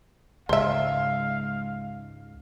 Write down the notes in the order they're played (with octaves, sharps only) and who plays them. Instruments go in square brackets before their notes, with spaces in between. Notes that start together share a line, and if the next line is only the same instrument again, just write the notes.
[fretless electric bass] C#2 G#2 [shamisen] C5 E5 [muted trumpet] F5